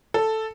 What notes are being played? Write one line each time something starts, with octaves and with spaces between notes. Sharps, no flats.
A4